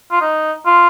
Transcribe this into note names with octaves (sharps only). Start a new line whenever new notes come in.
F4
D#4
F4